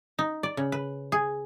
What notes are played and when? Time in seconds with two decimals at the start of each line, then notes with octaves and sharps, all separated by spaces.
0.19 D#4
0.43 D5
0.57 C#3
0.72 B4
1.12 G#4